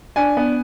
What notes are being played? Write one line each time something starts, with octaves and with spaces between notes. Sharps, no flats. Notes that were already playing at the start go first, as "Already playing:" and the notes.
D4 G#5
B3